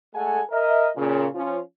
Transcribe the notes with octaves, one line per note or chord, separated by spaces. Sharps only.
G#3 A3 A4 F#5 G#5
A#4 D#5 E5
A#2 C#3
F3 C#4 F4